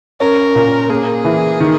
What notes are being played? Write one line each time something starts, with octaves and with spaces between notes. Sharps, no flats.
C#4 A#4
A#2
A#3 G#4
E3
D#3